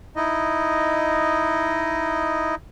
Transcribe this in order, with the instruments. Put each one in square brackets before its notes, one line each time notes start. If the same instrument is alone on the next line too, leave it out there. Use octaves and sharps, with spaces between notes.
[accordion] D#4 E4 D#5